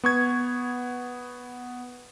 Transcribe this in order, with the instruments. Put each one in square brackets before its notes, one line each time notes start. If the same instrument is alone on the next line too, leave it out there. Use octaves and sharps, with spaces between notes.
[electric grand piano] B3 C#6 G#6